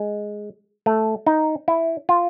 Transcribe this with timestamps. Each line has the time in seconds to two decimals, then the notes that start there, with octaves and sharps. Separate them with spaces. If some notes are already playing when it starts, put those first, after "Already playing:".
Already playing: G#3
0.86 A3
1.26 D#4
1.68 E4
2.09 F4